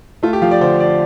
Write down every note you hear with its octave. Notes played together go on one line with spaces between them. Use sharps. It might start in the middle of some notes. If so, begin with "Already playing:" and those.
A3 F4
G4
F3 F5
D5
D3 C5
D5